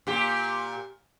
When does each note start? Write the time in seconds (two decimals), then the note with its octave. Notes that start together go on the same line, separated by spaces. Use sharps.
0.07 A#2 G4